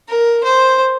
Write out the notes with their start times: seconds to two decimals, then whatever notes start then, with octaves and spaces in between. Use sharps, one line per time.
0.09 A#4
0.44 C5